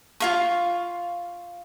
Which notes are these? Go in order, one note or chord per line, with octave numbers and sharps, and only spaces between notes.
F4 F5 C#6